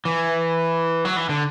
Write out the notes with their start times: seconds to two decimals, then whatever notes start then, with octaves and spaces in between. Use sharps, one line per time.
0.05 E3
1.05 F#3
1.16 E3
1.29 D3